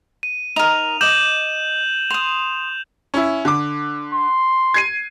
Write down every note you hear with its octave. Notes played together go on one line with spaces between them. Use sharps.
D#7
D#4 A#4 F7
D#5 D6 G6 E7 F#7
C6 D#6 F7
C#4 E4
D3 D6
C6
G#6 C7 D#7